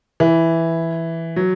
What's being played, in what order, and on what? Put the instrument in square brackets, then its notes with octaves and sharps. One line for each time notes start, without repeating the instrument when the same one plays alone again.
[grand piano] E3
F#3